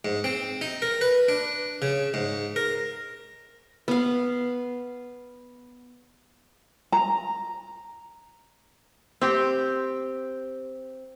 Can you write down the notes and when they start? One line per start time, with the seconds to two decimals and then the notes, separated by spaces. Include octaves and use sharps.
0.05 G#2
0.24 C4
0.61 D#4
0.82 A#4
1.01 B4
1.28 D4
1.82 C#3
2.14 G#2
2.56 A#4
3.88 B3 F5
6.92 A#5
9.21 C4 G4